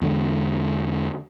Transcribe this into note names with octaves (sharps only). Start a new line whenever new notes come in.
E2 D3 G#3